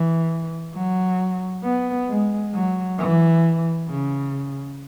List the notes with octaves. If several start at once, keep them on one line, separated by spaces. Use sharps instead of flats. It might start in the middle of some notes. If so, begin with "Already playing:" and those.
Already playing: E3
F#3
B3
G#3
F#3
E3
C#3